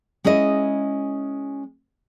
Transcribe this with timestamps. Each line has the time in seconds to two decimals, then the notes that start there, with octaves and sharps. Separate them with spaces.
0.24 G#3 C#4 E4 D#5